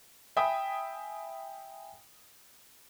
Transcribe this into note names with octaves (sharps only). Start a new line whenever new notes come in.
E5 G5 G#5 B5 D#6